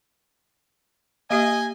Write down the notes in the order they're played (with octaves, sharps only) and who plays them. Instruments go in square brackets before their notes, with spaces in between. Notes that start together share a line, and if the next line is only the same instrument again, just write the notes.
[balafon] A#3 G4 E5 [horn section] D#5 G#5